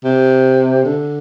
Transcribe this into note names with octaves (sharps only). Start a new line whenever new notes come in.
C3
D3